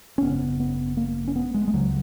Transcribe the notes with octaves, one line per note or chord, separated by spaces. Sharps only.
C#4
G#1 F#2 C#3 B3
B3
A#3
C#4
B3
G#3
G#3
C#2 C#3 F#3